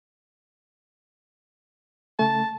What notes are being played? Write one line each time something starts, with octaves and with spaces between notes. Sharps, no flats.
C#3 A3 A5